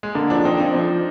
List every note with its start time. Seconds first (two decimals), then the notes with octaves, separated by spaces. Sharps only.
0.03 G#3
0.15 D3 A#3
0.30 F3 D4
0.45 C4 D#4
0.60 F2 D#4
0.74 F3